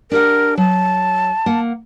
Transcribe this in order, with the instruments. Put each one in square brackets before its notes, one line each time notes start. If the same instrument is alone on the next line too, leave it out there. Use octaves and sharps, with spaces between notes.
[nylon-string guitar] D4 G4 F#5 [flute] A#4
[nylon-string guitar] F#3 [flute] A5
[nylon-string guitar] A#3 F#5